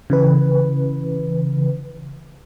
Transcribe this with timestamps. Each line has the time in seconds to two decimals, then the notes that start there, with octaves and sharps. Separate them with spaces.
0.10 C#3 E3 B4